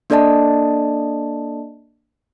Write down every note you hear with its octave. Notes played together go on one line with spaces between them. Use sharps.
A#3 D4 A4 D5 D#5 A5